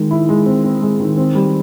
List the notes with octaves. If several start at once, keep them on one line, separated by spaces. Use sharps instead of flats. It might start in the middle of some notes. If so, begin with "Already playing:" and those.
Already playing: D#3 G#3
E4
G#3
C4
C4
G#3
D#3
C4
G3